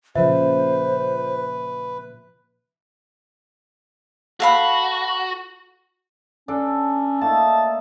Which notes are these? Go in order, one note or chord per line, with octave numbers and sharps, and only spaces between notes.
A#2 C#3 F3 B4 C5 E5
F#4 A4 F5 B5
C#4 D4 A4
A3 A#3 D#4 A5